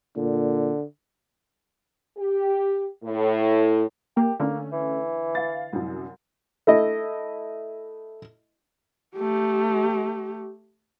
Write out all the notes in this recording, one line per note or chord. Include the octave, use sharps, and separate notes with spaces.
A#2 D3
G4
A2
A#3 G4
D3 A3 A#3 C#4
E3
F5 A6
C2 F#2
A3 E4 D#5
A3 G4